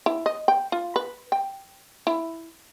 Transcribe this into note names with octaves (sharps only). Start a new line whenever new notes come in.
E4
D#5
G5
F4
B4
G5
E4